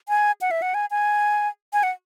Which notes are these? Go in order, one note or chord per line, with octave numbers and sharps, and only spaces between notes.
G#5
F#5
E5
F#5
G#5
G#5
G#5
F#5